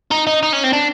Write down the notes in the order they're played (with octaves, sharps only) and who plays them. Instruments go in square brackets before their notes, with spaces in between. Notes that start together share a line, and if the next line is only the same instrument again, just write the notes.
[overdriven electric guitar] D#4
D#4
D#4
C#4
C4
D4